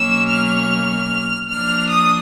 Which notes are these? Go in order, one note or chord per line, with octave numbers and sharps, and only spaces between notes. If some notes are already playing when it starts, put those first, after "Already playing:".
Already playing: B2 F#3 A#3 C#4 E6
F6
F3 A#3 D4 F6
D#6